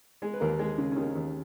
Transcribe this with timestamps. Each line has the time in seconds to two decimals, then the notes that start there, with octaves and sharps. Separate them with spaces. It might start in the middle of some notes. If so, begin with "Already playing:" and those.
0.22 G#3 G#4
0.34 B4
0.40 D#2 A#3 A#4
0.59 G#3 G#4
0.78 C#3 C#4
0.92 C#4
0.96 D#2 D#3 D#4
1.15 D#2